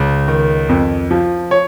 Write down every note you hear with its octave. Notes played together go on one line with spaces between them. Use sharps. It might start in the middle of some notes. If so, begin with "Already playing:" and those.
Already playing: C#2
D#3
F2
F3
C#5